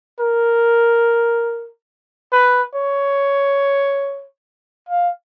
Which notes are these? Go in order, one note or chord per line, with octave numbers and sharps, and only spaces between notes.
A#4
B4
C#5
F5